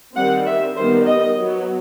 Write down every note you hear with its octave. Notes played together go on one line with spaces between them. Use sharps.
D#3 G3 C4 F#5
E5
D#3 G3 B3 C5
D#5
F#3 B3